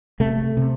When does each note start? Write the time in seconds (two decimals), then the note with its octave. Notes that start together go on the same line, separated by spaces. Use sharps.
0.20 C3 A3
0.57 C3